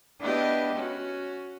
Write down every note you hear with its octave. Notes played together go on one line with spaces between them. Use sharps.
B3 D4 E4 G4 B4 D#5
C#4 F#4